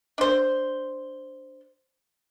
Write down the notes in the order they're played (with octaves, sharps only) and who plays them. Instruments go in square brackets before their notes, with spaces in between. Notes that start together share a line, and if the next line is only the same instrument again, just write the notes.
[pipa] D4 C5